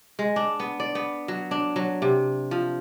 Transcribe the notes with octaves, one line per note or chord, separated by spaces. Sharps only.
G#3
D4
B3
D5
B3
F#3
D4
F#3
C3
F3